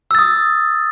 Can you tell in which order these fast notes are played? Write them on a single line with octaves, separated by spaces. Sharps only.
E6 A6 D#6